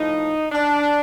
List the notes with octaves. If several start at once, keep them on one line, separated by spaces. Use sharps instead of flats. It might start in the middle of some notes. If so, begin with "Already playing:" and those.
Already playing: A2 F3 D#4
D4